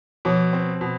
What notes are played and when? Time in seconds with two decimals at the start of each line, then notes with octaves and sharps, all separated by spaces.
0.25 B2 F3
0.53 C4
0.81 B2